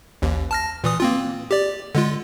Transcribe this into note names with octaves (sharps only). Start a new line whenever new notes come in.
A1 D#2
A5 F6 A#6
A#2 E3 D#6
A#3 C4 F4
G4 D5
D3 G#3 F4